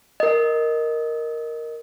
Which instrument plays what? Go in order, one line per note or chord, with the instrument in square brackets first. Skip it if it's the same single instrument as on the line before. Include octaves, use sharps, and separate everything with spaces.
[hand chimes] A#4 D#5